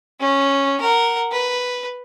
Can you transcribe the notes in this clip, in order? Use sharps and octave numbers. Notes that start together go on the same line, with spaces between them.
C#4
A#4 F#5
B4